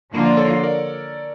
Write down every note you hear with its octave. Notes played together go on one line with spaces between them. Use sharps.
D3 F3 A#3 D4 F4
D5
A4 C#5
A#4 D5